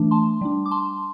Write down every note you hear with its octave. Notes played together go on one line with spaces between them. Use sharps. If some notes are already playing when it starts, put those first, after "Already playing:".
Already playing: E3 A3 D4
A5 C6
G3 D4
D6
A5 C6